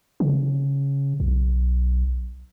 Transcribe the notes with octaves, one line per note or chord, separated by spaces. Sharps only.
C#3
B1